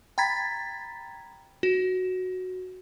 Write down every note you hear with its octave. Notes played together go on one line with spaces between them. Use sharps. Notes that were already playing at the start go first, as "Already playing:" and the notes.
G5 A#5 B5 G#6 A6 B6
F#4